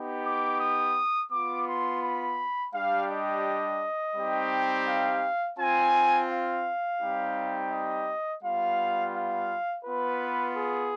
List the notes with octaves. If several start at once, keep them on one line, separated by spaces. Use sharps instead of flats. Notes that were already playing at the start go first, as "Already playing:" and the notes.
Already playing: B3 D#4 G4
D6
D#6
B3 F4 D6
C6
B5
G3 D4 G4 F5
D#5
G3 C4 D#4 G4
F5
C4 F4 G#5
F5
G3 C4 D#4 G4
D#5
G3 B3 F4 F5
F5
B3 F4 B4
G#4